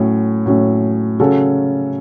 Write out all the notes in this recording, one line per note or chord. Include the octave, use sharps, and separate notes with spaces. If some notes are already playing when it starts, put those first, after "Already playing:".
Already playing: A2 F#3 C#4
A2 F#3 C#4
C#3 F#3 C#4 F#4 A4